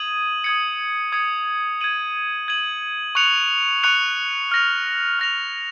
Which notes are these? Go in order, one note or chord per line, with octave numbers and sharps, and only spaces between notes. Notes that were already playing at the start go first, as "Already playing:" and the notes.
Already playing: D#6 G#6 D#7 F#7
D#6 G#6 C#7
D#6 G#6 C#7
G#6 D#7 F#7
G#6 D#7 F#7
C#6 F#6 C#7 F7
C#6 F#6 C#7 F7
F6 A#6 F7
F6 A#6 F7